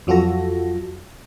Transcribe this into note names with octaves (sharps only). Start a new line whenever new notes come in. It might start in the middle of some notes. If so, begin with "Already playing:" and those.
F2 F#3 F4 F#4 A4 A#6